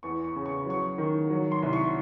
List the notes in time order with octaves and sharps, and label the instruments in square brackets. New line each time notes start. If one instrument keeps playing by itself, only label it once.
[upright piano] E2 C#6
C#6
C#3
C#6
F#3 C#6
D#3
F#3
C6
C2
C#6